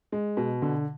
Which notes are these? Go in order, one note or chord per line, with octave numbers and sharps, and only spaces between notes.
G#3
B2
D3